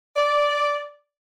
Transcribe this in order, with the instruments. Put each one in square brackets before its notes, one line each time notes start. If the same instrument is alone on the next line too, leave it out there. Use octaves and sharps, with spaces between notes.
[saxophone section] D5